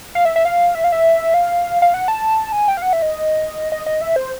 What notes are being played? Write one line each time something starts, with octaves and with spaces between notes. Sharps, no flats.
F5
E5
E5
F5
E5
F5
E5
F5
F5
F#5
A5
G#5
G5
F5
F#5
E5
D#5
D#5
D#5
E5
C5